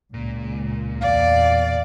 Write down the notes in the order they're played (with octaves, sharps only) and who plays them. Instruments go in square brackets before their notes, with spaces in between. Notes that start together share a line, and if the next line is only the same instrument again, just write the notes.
[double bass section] C#2 [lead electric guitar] A#2
[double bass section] E2 [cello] D5 [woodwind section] F5